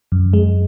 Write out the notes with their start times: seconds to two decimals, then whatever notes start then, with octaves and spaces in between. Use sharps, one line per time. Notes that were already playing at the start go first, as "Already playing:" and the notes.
0.12 F#2
0.33 G#3